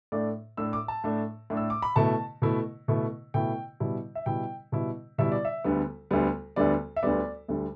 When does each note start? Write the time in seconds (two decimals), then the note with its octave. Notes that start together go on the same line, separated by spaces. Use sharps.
0.12 A2 A3 D4 D5
0.57 A2 A3 D4 E6
0.73 D6
0.88 A5
1.04 A2 A3 D4
1.50 A2 A3 D4
1.57 E6
1.70 D6
1.82 B5
1.96 B2 A3 E4 A5
2.42 B2 A3 E4
2.88 B2 A3 E4
3.34 B2 A3 E4 G5
3.80 B2 G3 E4
4.15 E5
4.26 B2 G3 E4 G5
4.72 B2 G3 E4
5.18 B2 G3 E4 E5
5.32 D5
5.45 E5
5.64 D2 D3 G3 B3
6.11 D2 D3 G3 B3
6.56 D2 D3 G3 B3 D5
6.96 E5
7.03 D2 D3 G3 B3 D5
7.48 D2 D3 G3